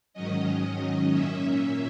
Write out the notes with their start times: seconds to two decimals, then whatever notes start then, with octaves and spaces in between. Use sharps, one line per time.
0.14 G#2 D#3 F#3 C#4 D#5
1.11 A#2 A#3 C#4 E5